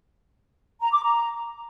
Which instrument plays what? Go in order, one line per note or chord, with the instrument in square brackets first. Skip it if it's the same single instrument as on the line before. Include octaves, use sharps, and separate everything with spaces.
[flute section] A#5
D6
A#5